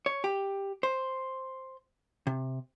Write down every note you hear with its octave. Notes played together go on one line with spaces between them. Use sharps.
C#5
G4
C5
C3